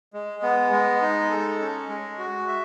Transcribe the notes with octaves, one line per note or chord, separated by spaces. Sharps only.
G#3
B3
G#3
D#4
A4
C#4
G#3
F#4
E5